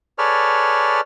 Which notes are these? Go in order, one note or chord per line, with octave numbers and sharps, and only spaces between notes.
G#4 A4 B4 C#5 D5 F6